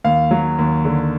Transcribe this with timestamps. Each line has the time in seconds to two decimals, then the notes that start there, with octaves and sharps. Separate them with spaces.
0.04 D#2 F5
0.31 F#3
0.58 D#2
0.85 D3